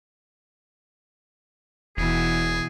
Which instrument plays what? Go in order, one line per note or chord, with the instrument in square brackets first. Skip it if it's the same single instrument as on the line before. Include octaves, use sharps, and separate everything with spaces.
[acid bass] E1 [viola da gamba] B2 E3 [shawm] G#4